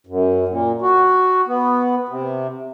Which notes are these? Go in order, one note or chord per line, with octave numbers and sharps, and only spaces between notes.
F#2
A#2
F#4
B3
C3